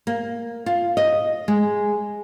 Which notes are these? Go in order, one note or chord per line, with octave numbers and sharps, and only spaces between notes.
A#3
F4
D#5
G#3